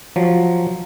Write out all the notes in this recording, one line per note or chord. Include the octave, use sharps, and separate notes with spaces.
F3 F#3